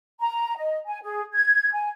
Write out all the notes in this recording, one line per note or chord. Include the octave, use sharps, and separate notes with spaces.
A#5
D#5
G#5
G#4
G#6
G#5